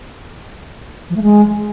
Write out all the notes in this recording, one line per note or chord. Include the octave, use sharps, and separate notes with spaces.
F3
A3
G#3